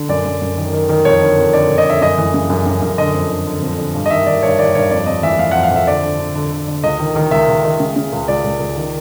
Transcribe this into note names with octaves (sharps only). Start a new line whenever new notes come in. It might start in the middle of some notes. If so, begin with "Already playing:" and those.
Already playing: D3
F#2 D5
F#2
F#2
D#3
D#3
D#3
F2 C#5
D3
F2
D3 D5
F2
D#5
D3 E5
F#2 D#5
E3
C#3
F#2
F#2
F#2
D3 D#5
F2
D3
D3
F2
D3
G2
D#5
D#3 E5
D#3 D5
G2 C#5
D#3 D5
G2 C#5
F2 D5
F2 D#5
E3 E5
E3 F5
F#5
F2
F5
F2 E5
D3 D5
D3
D3
D3
D3
D3
C#2 D#5
D#3
D#3
C#2 E5
C#2
D#3
C#3
C#3
C#2
C#2 D5
C#2
C#2
D#3